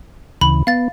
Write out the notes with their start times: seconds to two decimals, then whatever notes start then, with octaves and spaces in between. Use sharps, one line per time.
0.41 D2 C#3 E3 B5
0.67 B3 F5 A6